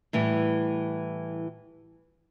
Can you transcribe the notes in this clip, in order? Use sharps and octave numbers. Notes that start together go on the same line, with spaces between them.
A2 E3 G3